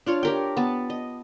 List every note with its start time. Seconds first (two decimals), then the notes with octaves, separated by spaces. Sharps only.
0.06 D4 F4 C#5
0.23 G4 A#4 G5
0.57 B3 A5
0.90 D#5